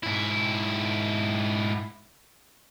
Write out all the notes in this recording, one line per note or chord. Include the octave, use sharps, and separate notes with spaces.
G#2 E4